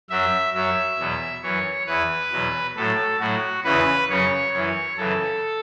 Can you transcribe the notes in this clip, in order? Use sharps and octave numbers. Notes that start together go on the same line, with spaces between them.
F#2 F#3 E5
F#2 F#3 E5
E2 B2 F#3
F#2 E3 C#5
E2 E3 B4
E2 B2 F#3
A2 F#3 A4
A2 F#3 F#4
E2 C#3 E3 B4
F#2 C#3 F#3 C#5
F#2 E3 C#5
F#2 C#3 E3 A4